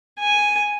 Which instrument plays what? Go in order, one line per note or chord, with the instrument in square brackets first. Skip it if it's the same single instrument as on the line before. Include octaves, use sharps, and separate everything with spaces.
[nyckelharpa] G#5